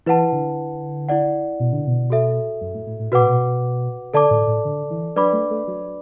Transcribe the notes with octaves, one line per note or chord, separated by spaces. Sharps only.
E3 E4 B4 F#5 A5
D3
E4 D5 F#5
B2
D3
B2
F#4 A4 E5
F#2
A2
A2
A2
B2 F#4 B4 F#5 D6
A2
B2
D3 A4 D5 A5 D6
A2
A2
D3
E3
F#3 D4 B4 D5 B5 D6
A3
A3
F#3